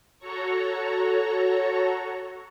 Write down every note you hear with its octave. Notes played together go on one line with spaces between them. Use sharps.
F#4 A4 C#5 A#5 C#6